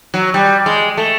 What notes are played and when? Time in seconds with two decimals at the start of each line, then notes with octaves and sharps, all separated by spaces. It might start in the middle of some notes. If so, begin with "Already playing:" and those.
0.14 F#3
0.34 G3
0.66 G#3
0.97 A3